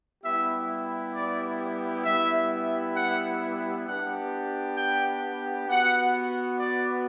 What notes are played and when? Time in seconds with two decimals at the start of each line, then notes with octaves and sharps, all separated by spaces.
0.23 G3 B3 E4 G4 E5
1.14 D5
2.04 G3 B3 E4 G4 E5
2.95 F#5
3.86 B3 D4 G4 F#5
4.77 G5
5.67 B3 F#4 F#5
6.58 D5